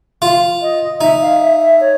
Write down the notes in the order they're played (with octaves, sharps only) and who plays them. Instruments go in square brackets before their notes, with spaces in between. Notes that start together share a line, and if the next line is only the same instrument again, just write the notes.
[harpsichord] F4
[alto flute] D#5
[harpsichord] D#4 [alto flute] E5
[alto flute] F5
E5
E5
C#5